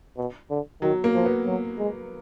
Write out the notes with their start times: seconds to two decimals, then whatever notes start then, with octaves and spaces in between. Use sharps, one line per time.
0.18 B2
0.50 D3
0.82 D#3 F#3
1.04 A#3
1.15 F3
1.25 B3
1.47 F#3
1.79 G#3